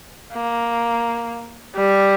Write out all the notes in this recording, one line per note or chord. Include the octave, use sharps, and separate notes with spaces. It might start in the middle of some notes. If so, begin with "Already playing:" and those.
A#3
G3